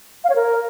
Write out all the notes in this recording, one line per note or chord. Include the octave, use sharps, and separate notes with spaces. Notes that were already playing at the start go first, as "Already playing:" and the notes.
F5
C#5
A#4